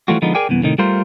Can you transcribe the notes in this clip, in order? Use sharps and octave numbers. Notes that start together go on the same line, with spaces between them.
E3 F3 G3 A3 F4 F#4
D3 F3 G#3 B3 D#4
G#4 A#4 D5 G5 G#5
C2 F#2 E3 B3
A2 C3 D#3 D#4
G3 A3 F4 A#4 C5